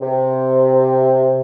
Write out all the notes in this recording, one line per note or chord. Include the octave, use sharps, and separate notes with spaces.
C3